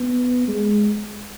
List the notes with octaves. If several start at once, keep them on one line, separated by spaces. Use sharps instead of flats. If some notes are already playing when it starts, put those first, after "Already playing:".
Already playing: B3
G#3